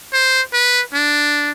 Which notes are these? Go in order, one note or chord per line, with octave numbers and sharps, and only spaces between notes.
C5
B4
D4